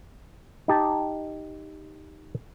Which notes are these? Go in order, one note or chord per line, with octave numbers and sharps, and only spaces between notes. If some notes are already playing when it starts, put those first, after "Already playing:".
D#4 G4 A5